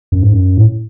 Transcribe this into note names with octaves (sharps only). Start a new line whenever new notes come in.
F#2
G#2
F#2
A2